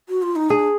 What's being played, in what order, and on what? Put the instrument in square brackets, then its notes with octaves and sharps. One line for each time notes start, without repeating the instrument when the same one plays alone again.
[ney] F#4
F4
D#4
[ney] D4 [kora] G#4